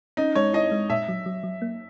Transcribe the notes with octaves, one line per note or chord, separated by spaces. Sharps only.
C#4 D#4
G#3 C#5
E4 D#5
G#3
A#2 E5
F#3
F#3
F#3
A#3